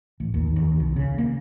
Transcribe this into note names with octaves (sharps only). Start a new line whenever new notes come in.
A1
D#2
D#2
C2
C#3
A#3